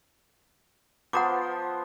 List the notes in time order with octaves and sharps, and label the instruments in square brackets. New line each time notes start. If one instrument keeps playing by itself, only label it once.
[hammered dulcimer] F3 B3 C5 [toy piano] F#5 A#5 D6